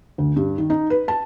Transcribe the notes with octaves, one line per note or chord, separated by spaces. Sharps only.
D2
G2
D#3
D#4
B4
A5